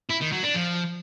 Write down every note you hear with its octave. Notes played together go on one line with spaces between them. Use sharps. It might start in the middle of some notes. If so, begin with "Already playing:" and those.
E4
D#3
F#3
D4
F3